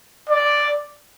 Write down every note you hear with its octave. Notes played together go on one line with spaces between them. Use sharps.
D5